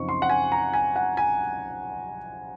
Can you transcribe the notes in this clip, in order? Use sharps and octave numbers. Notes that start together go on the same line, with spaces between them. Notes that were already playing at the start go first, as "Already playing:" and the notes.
Already playing: F#2 C#3 F3 C4 D#4 C#6
C6
F#5
G#5
A#5
G#5
F#5
G#5